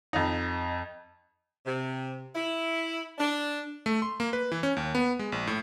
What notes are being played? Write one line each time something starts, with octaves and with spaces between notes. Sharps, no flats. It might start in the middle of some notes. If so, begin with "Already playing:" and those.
F2 D#4
C3
E4
D4
A3
C6
A#3
B4
E3
C#4
D#2
B3
G#3
A#1
A2